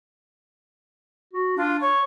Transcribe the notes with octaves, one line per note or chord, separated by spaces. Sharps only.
F#4
D4 F4
C#5 C#6